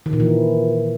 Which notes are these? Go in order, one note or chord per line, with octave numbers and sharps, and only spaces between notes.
D#3
A#2
E3